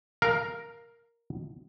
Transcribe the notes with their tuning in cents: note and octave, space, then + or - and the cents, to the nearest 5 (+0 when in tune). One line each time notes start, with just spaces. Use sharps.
A#4 +0 F5 +0